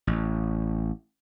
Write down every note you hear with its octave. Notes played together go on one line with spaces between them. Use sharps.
A1